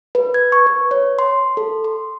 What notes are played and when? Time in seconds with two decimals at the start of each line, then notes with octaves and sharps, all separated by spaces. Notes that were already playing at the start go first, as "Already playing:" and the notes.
0.15 B4
0.34 G#6
0.52 C#6
0.66 B4
0.91 C#5
1.19 C6
1.57 A4
1.84 C6